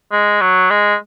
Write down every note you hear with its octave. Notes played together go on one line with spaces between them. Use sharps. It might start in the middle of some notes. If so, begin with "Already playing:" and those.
G#3
F#3
G#3